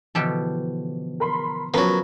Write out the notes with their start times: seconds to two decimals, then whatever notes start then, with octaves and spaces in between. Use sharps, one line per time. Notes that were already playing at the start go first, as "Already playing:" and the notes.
0.15 B2 D3 E3 F3 G4 A4
1.20 A#4 B5 C6
1.74 F3 F#3 B3 C#4 A#4